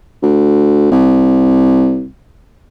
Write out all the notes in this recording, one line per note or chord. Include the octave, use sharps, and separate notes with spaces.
D2
C2